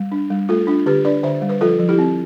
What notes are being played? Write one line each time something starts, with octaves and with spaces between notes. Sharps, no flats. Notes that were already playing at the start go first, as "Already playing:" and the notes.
Already playing: G3
D4
G3
A3 F4 A4
D4 F4
D3 G4 B4
D4 B4 D5
D3 C5 E5
G3
B4
F3 F4 A4
F3
E4 G4
C4